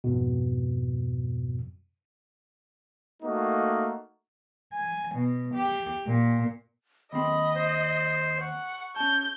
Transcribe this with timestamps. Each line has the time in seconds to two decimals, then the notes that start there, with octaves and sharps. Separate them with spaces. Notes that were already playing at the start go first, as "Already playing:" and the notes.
0.04 F2 G#2 B2
3.22 A3 A#3 D#4 F#4
4.72 G#5
5.15 B2
5.54 G4
6.07 A#2
7.13 D#2 C4 D#5 B5
7.54 C5
8.40 F#5 C#6
8.96 C#4 A5 G6